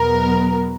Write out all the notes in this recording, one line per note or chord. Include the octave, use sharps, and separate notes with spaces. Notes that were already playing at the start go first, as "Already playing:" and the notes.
Already playing: E2 B2 F#3 B3 A#4